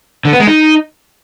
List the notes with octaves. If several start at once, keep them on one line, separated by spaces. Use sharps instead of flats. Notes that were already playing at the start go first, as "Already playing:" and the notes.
D3
B3
G#3
D#4